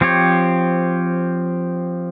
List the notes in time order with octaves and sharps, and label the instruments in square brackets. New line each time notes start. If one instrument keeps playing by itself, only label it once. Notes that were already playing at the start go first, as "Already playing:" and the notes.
[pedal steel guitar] F3 C4 G4 C#5